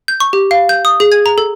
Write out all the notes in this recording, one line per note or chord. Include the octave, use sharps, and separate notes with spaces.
G6
C#6
G4
F5
G6
D#6
G#4
G#6
A#5
A4